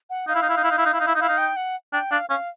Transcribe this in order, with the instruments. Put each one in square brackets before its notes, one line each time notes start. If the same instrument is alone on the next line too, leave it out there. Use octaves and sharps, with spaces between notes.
[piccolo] F#5
[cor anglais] D#4 [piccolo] F5
[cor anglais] E4
D#4
E4
D#4
E4
D#4
E4
D#4
E4
D#4
E4
D#4
[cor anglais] E4 [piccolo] F5
[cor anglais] D#4
[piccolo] G5
F#5
[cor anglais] D4 [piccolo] G5
[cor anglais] D4 [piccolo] F5
[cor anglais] C#4 [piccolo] F5